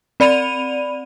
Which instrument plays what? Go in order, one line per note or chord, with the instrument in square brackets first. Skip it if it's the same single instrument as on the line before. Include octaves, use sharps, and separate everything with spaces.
[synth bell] C4 D5 B5 D#7 F7